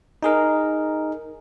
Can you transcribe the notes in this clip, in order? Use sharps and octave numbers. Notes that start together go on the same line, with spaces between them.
D#4 G#4 A#4